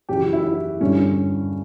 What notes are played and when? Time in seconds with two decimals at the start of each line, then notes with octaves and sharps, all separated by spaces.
0.09 F#2 C#3 E3 G4
0.20 F#4
0.33 E4
0.44 E4
0.80 G2 D3 C#4
0.93 C#4